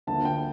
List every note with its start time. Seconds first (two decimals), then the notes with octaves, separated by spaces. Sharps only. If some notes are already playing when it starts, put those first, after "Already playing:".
0.07 D2 D3 F3 A#3 A5
0.25 G5